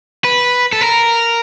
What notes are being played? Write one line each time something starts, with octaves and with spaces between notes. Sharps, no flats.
B4
A4
A#4